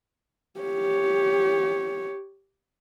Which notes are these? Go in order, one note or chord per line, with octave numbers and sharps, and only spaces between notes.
G4 C#5